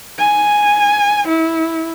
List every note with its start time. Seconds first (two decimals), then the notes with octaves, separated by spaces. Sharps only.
0.19 G#5
1.28 E4